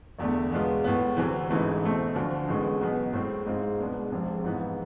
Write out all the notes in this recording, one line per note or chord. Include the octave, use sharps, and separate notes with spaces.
E1 E2 D3 A3
E2 B2 G#3 B3 F4
A2 G#3 B3
D2 C3 E3
A1 G#2 E3 A3
E2 B2 A3 C4
D2 D3 F3
A1 A2 G#3 B3
B1 B2 B3
A2 G#3 C4
G#2 G#3 C4 F4
C2 B2 G#3 B3 D4
F1 F2 C3 F3 G#3
G#2 E3 B3 F4